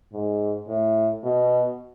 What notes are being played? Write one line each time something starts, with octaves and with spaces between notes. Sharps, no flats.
G#2
A2
B2